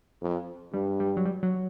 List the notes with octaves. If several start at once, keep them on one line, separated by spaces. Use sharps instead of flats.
F2
G2 G3
G3
F#3
G3
F#3